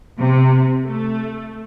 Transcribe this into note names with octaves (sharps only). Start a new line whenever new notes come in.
C3
A3